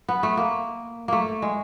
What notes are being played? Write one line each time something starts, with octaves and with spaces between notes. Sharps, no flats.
B3
A3
A#3
A3 A#3
G#3